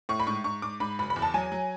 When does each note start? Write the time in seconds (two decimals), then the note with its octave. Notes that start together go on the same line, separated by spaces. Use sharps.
0.09 A2 C#6
0.20 B5
0.27 G#2 C#6
0.44 G#2 C#6
0.62 G#2 D6
0.80 G#2 B5
0.99 F#1 B5
1.10 B5
1.16 E2
1.22 A5
1.34 F#3 G#5
1.52 F#3